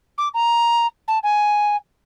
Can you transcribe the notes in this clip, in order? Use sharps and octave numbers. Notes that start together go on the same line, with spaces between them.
D6
A#5
A5
G#5